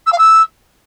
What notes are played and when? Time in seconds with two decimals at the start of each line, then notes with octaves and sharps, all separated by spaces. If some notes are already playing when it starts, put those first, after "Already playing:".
0.06 E6
0.12 F5
0.18 E6